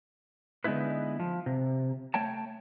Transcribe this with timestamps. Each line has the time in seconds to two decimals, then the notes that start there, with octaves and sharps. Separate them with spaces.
0.64 D3 G#3 B3 D#4 E4 B4
1.20 F3
1.46 C3
2.14 A3 C#5 G5 A5